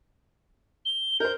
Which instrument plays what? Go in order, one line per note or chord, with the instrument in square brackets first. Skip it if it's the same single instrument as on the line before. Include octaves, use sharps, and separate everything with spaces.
[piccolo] G7
[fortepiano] A#4 C5 [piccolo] G6